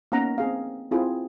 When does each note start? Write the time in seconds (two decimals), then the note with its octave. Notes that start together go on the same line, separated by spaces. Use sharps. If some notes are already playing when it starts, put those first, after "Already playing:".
0.12 A#3 B3 C#4 D#4 F#5 A#5
0.38 C4 G#4 F5
0.91 C4 E4 F4 G#4